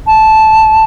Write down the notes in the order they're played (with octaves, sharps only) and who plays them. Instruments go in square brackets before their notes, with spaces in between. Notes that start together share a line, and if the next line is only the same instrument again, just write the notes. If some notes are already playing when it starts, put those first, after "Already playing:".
[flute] A5